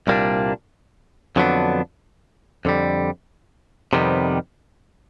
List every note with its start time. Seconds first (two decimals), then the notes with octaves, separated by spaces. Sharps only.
0.07 C2 A#2 G3 A#3 D4
1.36 F2 D3 F#3 B3 D4
2.65 F2 D3 G3
3.93 F2 C3 D#3 G3 B3